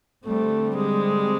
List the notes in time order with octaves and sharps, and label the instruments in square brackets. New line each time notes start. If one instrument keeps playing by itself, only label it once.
[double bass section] D3 G3 C4 [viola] A3
[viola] G#3